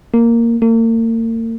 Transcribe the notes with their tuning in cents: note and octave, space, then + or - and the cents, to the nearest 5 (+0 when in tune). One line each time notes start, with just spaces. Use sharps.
A#3 -5
A#3 -40